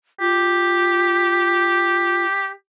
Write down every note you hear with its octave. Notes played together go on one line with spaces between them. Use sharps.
F4 G4